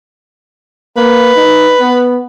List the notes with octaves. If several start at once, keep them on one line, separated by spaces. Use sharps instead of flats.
A#3 B4
D#4
B3